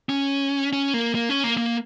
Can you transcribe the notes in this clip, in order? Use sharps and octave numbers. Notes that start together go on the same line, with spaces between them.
C#4
C#4
A#3
A#3
C#4
A#3
A#3